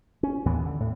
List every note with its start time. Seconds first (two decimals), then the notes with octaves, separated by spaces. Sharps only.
0.23 C#4
0.46 D#2 A2 E3 B3
0.66 D3
0.80 A2